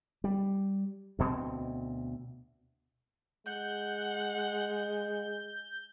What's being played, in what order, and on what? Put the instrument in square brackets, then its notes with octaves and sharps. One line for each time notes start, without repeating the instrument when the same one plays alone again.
[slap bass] G3
D2 B2 C4
[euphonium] G#3 [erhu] F#5 [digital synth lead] G6